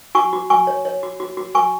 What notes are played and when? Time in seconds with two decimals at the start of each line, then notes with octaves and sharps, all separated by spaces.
0.15 F#4 G#5 C#6
0.33 F#4
0.50 F#4 G#5 C#6
0.67 C#5
0.85 C#5
1.03 F#4
1.20 F#4
1.37 F#4
1.55 F#4 G#5 C#6